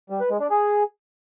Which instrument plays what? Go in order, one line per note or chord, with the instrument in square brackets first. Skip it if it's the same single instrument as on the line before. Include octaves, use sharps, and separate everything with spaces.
[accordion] G3
B4
G#3
D4
G#4